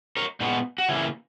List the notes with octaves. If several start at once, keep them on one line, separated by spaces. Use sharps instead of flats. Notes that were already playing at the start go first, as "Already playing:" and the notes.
A#4 C#5
A#2 G#3 B3 D#4 F#4
F#4
C#3 E3 A#3 C#4 E4